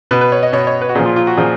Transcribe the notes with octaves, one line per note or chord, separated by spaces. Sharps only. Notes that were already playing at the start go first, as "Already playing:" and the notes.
B2 B4
B4
C#5
D#5
B2 C#5
C#5
B4
F#4
A#2 F3 G#4
F4
F4
F#4
A#2 F3 G#4